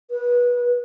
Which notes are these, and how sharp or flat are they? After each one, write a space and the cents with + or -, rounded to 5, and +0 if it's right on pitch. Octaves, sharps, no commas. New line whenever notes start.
B4 -25